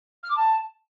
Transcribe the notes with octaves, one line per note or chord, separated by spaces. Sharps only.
F6
D6
A5